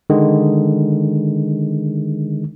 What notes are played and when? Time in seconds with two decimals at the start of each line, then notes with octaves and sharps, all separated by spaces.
0.10 D3 D#3 G#3